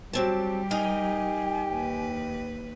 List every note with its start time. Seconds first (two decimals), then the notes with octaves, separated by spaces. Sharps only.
0.13 F#3 G3 C4 G4 A5
0.71 D#4 A#4 D#5 G#5
1.72 D#2 B4